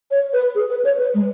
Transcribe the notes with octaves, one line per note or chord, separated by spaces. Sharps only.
C#5
B4
G#4
B4
C#5
B4
G#3